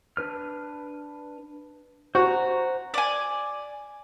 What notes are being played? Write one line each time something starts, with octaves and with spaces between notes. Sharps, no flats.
D4 B4 F6
F#4 C5 A#5
D5 G#5